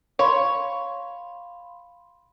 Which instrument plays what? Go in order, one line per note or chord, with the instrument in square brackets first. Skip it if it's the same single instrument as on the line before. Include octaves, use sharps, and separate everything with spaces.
[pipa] C#5 [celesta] F5 B5 C6